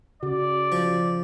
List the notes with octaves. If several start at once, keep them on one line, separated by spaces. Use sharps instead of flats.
C#3 F#4 D5
F3